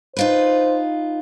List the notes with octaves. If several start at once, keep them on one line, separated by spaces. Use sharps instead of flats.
D#4 F4 B4 C5